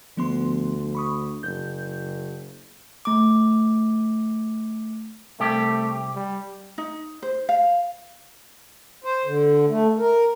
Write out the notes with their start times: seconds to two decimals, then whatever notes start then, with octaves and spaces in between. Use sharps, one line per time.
0.17 D2 F3 B3 C6
0.95 B5 C#6 D#6
1.43 F#1 G6
3.05 A3 D6
5.40 C2 A3 G4
6.15 G3
6.78 D#4
7.23 C5
7.49 F5
9.04 C5
9.25 D3
9.69 A3
9.99 A#4